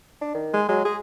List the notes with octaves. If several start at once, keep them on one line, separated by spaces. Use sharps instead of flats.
D4
D#3
G#3
F#3 G#3
G#3 G#4